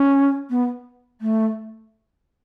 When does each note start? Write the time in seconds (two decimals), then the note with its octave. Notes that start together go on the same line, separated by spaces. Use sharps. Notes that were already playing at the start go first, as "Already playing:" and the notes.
Already playing: C#4
0.50 B3
1.21 A3